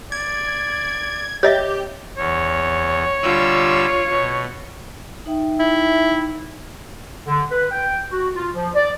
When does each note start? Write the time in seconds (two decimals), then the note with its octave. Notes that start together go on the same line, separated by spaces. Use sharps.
0.12 D5 G#6
1.43 G4 C#5 D#5 E5
2.18 E2 C#5
3.23 D3 G3 F4 E6
4.10 B2
5.26 D#4 E5 G5
5.60 E4
7.27 D3
7.50 B4
7.71 G5
8.11 F#4
8.34 F4
8.54 F3
8.75 D5